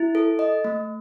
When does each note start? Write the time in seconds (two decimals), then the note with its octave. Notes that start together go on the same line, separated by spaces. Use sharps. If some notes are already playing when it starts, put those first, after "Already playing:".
Already playing: E4
0.15 A4
0.39 D#5
0.64 A3